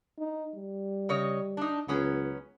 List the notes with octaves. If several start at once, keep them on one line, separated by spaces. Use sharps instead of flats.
D#4
G3
C#3 C#5 D#5
D4 D#4
C#2 F#3 B3 C#4